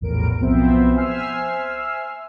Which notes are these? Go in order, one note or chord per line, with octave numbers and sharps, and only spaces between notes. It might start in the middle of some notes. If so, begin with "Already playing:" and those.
A#1 E2 A2 A#4 D7
B1 F3 B3 C4 C5 E5
C5 E5 G#5 E6 F6 C7